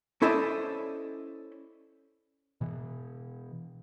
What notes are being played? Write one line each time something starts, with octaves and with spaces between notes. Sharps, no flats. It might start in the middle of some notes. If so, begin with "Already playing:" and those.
C#4 E4 A4 C5 D5 D#5
B2 E3